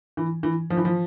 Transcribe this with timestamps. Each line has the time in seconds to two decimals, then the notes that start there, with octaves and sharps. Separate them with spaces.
0.17 E3
0.43 E3
0.70 F3
0.77 E3
0.85 F3